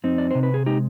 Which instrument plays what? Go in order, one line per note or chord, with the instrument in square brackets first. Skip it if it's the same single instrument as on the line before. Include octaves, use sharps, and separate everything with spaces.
[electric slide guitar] F2 C4 D#4
D5
C3 C5
B4
G#4
G#3 D#4 G4